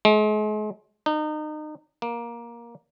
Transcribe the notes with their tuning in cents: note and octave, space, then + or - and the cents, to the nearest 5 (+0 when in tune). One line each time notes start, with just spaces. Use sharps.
G#3 +40
D#4 -30
A#3 +15